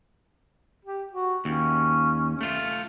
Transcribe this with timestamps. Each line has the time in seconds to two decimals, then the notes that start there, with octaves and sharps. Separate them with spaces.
0.85 G4
1.13 F#4
1.45 D#2 C#4
2.41 A3 F4